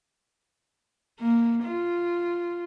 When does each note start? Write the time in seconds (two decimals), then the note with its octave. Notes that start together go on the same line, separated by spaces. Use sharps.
1.20 A#3
1.65 F4